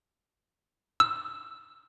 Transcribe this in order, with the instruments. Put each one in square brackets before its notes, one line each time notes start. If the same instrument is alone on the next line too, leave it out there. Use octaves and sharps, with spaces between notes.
[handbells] E6